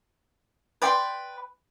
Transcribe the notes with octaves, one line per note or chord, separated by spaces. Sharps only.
B4 D5 G5 C6